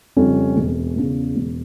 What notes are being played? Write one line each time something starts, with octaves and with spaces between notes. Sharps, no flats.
F2 C#3 G3 C#4
E1
E2 C#3
E1